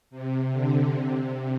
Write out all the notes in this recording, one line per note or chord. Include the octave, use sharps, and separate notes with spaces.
C3
D3
C3